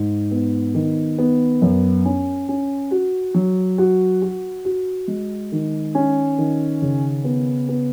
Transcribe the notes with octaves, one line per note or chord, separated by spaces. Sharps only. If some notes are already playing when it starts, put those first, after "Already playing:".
Already playing: G#2
B3
D#3
B3
F#2
C#4
C#4
F#4
F#3
F#4
F#4
F#4
G#3
D#3
C#4
D#3
C#3
B3
B3